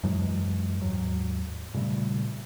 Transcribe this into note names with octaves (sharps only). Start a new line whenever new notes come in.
F#2 E3 F#3 G#3
D#2 G#2 F#3
A#2 C#3 G3 A3